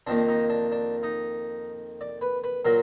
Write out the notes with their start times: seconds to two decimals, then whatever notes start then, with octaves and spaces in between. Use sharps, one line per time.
0.07 F2 D#3 A#3 D4
0.28 D#4
0.50 D4
0.72 D4
1.03 D#4
2.01 D5
2.21 B4
2.44 B4
2.65 A#2 F#3 A#4